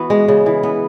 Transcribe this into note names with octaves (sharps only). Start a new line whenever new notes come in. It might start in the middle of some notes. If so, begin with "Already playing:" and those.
Already playing: E3 B3 F#4
G#3
C#3
E3
B3